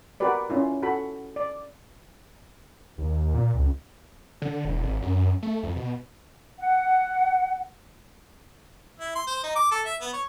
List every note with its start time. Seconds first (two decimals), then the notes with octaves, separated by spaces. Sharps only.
0.20 F#4 G4 A#4 B4 D5
0.50 C#4 E4 F4
0.83 F#4 A4 B5
1.36 D5
2.98 D#2
3.34 A#2
3.54 C#2
4.42 D3
4.65 E1
4.83 G#1
5.02 F#2
5.43 A3
5.63 F2
5.76 B2
6.59 F#5
8.99 E4
9.15 C6
9.27 C5
9.43 D#4
9.56 D6
9.72 A4
9.86 E5
10.01 B3
10.13 C#5